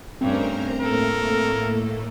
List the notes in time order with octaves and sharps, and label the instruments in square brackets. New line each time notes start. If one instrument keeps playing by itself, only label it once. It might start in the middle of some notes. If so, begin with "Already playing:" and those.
[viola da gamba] G2 A3 C#4 [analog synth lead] C4 [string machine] A#4 C5 A#5
[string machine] A2 A3 A#3 [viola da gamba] A4 [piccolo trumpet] A#4